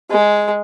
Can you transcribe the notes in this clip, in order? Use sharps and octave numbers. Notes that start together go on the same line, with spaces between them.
G#3